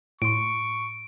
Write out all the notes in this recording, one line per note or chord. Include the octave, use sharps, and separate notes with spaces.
A2 C6 C#6 D7